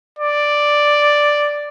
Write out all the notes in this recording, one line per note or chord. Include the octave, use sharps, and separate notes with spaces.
D5